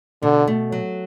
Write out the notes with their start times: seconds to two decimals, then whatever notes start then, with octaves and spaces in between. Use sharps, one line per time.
0.23 B2 D3
0.47 A3
0.72 F#3